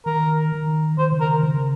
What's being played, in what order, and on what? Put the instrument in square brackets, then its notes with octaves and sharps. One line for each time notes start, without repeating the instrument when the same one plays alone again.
[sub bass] D#3 [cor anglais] A#4
[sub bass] D#3
[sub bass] D#3 [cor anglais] C5
[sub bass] C#3
[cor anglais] A#4
[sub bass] D#3
C#3